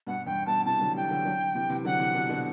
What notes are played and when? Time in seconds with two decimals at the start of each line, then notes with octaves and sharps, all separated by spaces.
0.07 G2 B2 F#5
0.26 E2 G2 G5
0.46 G2 B2 A5
0.65 C3 E3 A5
0.81 D3 F#3
0.96 E3 G3 G5
1.10 D3 F#3
1.25 D3 F#3
1.55 C3 E3
1.69 C3 E3
1.85 D3 F#3 F#5
1.99 C3 E3
2.15 B2 D3
2.29 B2 D3